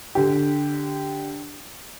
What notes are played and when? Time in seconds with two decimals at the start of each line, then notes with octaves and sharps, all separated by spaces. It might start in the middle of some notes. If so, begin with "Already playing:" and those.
0.15 D3 G4